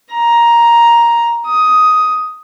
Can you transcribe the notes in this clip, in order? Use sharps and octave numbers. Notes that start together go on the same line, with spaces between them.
A#5
D#6